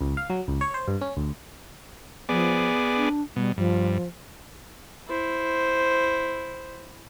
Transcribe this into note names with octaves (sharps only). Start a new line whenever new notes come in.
C#2
F5
F#3
C#2
C#5
C5
G2
C#4
D2
F3 B3 G#4 D5
D4
B2 G3
G2 F3
E4 C5